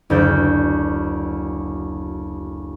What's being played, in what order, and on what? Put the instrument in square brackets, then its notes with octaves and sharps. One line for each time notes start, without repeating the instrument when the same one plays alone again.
[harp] F#1 D2 G6 D7